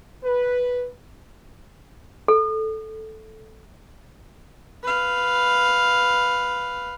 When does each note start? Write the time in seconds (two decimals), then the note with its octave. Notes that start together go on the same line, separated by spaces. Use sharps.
0.24 B4
2.28 A4
4.83 B4 F5